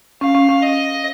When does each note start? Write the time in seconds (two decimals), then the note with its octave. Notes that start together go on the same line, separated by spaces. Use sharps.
0.21 C#4 F5
0.35 C#4
0.49 C#4
0.62 D#5